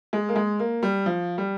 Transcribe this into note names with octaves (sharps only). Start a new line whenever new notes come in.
G#3
A#3
G#3
A#3
G3
F3
G3